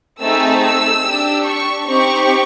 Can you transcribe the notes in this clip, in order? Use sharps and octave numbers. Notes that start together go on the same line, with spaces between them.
A3 C4 D#4 G#4 E6
E6
D4 G4
C#6
C4 D#4 G4 C#6